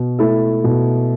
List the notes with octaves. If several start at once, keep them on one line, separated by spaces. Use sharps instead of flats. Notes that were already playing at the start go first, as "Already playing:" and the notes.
Already playing: B2
A3 E4 A4
B2